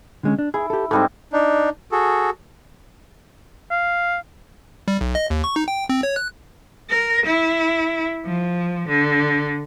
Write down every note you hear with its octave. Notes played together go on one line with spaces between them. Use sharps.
D3 G#3 C#4
D4
E4 G#4
G4 A4
G#2 G3 C4 D#4 A4
D4 D#4
F#4 G#4 A4
F5
G3
B1
D#5
D#2
C#6
D#4
G5
C4
C#5
F#6
A#4
E4
F3
D3